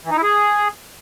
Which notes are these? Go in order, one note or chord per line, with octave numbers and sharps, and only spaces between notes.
E3
D#4
E4
G#4